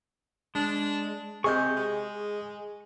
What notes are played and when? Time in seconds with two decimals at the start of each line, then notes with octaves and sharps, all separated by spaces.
0.55 G#3 D4
1.44 C3 G#4 D#5 C#6 G6
1.76 G#3